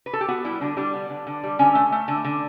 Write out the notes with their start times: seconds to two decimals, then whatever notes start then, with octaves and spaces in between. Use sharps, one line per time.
0.06 B4
0.13 A4
0.21 G4
0.28 B3 F#4
0.44 G3 E4
0.61 D3 D4
0.77 G3 D4
0.93 B3
1.10 D3
1.27 D3
1.43 G3
1.59 D3 C#4
1.75 A3
1.92 A3
2.08 D3
2.25 D3